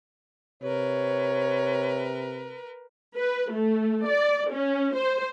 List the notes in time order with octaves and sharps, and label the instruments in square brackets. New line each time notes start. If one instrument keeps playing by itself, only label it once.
[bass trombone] C3 [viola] A#4 B4 [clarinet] C#5
[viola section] B4
A3
D5
C#4
C5